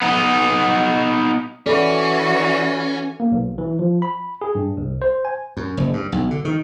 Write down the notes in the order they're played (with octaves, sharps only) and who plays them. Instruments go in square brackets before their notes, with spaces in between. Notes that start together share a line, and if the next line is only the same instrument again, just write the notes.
[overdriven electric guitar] B3 D#4
[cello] E3 F#4 [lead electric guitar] C#4 [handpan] A4 [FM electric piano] D5 B5
[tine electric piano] A#3
B1
E3
F3
B5
G#4
G2
C2
C5
G#5
[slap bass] F#2
F#1
G2
B1
D3
D#3